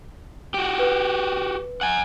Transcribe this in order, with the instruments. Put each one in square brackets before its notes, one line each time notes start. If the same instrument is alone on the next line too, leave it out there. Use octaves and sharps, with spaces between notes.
[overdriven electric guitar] F#4 G4
[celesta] B4
[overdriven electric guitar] F#5 G#5